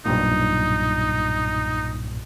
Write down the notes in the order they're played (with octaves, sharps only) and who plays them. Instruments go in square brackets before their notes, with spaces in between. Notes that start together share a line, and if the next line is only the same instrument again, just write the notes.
[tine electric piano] B1 G2 A#2 [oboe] D#4